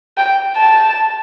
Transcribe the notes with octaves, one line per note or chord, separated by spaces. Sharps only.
G5
A5